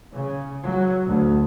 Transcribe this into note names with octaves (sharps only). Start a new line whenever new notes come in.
C#3
F#3
D2